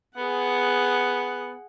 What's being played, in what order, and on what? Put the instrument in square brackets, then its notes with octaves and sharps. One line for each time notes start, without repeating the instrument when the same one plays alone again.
[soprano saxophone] B3 [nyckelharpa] G#4 F#5